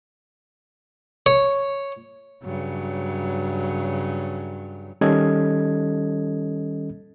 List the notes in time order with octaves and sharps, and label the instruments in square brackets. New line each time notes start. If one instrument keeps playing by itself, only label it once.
[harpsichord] C#5
[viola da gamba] G2 C#3 F#3
[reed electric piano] D#3 G3 C#4 A4 D#5 G#6